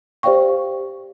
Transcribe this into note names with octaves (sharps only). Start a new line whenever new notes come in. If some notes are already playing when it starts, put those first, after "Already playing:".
G4 C5 D5 F5 G5 C#6